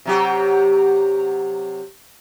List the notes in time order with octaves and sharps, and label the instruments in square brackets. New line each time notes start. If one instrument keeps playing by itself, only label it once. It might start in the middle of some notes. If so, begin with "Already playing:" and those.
[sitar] C3 F#3 G4